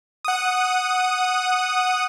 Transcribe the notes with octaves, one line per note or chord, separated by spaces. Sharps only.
F#5 D#6